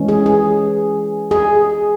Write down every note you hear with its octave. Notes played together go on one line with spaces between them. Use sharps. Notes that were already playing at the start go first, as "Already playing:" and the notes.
Already playing: E3 G#3 C#4
G#4
G#4
G#4